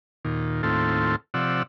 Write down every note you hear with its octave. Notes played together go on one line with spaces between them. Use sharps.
D#2 A#2
D#2 A2 C4 F4 A4
C3 F3 D5 F#5 E6